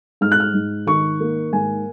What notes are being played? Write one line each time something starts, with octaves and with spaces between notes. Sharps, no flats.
G#2 F6
F#6
F6
G#2
D#3 C#6
A#3
G#2 G#5